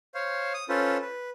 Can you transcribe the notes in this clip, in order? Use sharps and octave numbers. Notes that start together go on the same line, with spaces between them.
C5 C#5 F5
D#6
C#4 F4 A4 B4 C5
B4